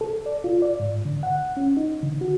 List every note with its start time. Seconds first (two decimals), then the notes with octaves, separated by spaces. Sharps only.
0.01 A4
0.26 D5
0.44 F4
0.62 D5
0.80 G#2
1.05 D3
1.23 F#5
1.57 C#4
1.77 D#4
2.03 D3
2.21 F#4